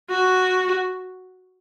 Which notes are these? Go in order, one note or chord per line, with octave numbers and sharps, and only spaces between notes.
F#4